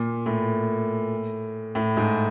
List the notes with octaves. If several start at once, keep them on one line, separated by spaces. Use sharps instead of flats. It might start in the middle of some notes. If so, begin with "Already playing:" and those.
Already playing: A#2
A2
A2
G#2